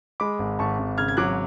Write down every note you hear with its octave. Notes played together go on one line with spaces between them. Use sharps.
G#3 B5 D6
G#1
G#1 A5 C#6
G#1
C#3 F6 G#6
G#6
F#3 D6 F#6